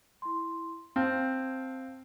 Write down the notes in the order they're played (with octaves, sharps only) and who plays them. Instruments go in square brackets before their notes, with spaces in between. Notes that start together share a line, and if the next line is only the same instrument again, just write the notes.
[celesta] E4 C6
[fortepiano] C4 [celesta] F5 A5 F6